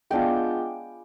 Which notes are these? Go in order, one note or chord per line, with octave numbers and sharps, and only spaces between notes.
G#3 B3 D4 F4 G5